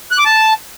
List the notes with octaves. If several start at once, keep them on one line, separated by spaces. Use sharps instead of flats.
F#6
D6
A5